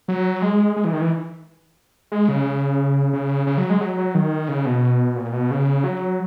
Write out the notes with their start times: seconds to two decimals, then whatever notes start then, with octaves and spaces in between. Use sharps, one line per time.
0.08 F#3
0.42 G#3
0.76 G#3
0.85 E3
0.93 D#3
1.01 E3
2.12 G#3
2.29 C#3
3.13 C#3
3.47 C#3
3.58 F#3
3.70 G#3
3.81 F#3
3.98 F#3
4.15 D#3
4.48 C#3
4.66 B2
5.16 A#2
5.33 B2
5.51 C#3
5.84 F#3